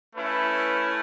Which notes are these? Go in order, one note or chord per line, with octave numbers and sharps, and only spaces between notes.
A3 C#4 E4 B4